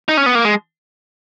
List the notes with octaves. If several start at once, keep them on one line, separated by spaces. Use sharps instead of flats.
D#4
C#4
B3
A#3
G#3